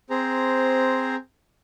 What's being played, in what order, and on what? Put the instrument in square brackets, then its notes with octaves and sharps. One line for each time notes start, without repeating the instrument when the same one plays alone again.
[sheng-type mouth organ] C4 G#4 C5 A#5